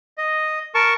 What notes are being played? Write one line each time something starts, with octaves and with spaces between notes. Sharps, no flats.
D#5
A#4 A5 C#6